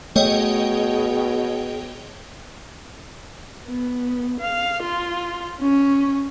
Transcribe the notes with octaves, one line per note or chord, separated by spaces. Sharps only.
B2 A3 G#4 C#5 D#5 G5
B3
F5
F4
C#4